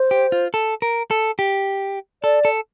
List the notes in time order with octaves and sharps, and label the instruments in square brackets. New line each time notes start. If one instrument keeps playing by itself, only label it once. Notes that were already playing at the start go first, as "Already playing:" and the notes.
Already playing: [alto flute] C5
[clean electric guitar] G4
F4
A4
A#4
A4
G4
[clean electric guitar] A4 [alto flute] D5
[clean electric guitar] A4